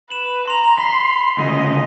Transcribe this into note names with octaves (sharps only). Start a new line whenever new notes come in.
B4 E7 F#7
A#5 C6 F7
B5 C6 B6 F7
D2 C#3 D#5